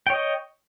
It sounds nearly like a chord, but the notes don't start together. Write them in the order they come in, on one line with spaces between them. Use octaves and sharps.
G5 C#5 D#5